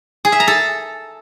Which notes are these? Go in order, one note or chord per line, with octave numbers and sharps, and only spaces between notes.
G#4
E5
A#5
A4